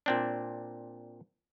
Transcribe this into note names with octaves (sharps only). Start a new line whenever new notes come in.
A#2 C4 D4